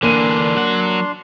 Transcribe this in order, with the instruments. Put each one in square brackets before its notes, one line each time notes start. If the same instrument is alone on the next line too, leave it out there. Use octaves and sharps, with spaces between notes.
[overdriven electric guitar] D3 E3 [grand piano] A#3 D#7 [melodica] D4 C6
[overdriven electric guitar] F#3 F#5